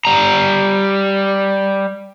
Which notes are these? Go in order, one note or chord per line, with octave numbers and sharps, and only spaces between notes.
G3 A#5